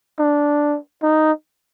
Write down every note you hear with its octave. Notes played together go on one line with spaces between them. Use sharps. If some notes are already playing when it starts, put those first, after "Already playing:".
D4
D#4